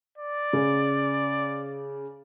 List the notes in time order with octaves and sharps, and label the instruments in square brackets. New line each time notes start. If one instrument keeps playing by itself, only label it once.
[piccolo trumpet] D5
[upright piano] C#3